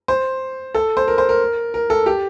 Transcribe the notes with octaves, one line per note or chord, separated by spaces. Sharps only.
C5
A4
C5
A#4
C5
A#4
A#4
A4
G4